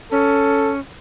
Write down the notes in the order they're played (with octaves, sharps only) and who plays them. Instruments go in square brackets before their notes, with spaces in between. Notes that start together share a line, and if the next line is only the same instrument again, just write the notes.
[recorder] C#4 [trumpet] A4